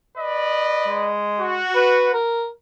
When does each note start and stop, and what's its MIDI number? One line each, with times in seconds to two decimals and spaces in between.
0.18 1.17 71
0.18 1.17 74
0.18 1.17 75
0.87 1.58 56
1.40 2.19 66
1.75 2.10 71
2.14 2.48 70